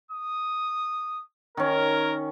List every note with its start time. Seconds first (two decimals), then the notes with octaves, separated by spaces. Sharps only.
0.11 D#6
1.57 D#3 C#4 A#4